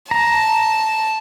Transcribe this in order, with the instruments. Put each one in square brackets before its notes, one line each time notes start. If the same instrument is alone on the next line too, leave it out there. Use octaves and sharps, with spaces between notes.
[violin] A5 [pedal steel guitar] A#5